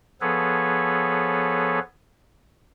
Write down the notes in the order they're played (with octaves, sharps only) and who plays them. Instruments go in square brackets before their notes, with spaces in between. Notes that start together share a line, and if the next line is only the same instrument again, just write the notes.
[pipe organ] F3 B3 G#4 A4 B4 C#5